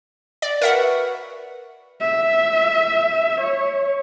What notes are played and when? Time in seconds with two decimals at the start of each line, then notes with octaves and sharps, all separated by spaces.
0.42 D5
0.62 F#4 A#4 B4 C#5 E5 F#5
2.01 E5
3.41 C#5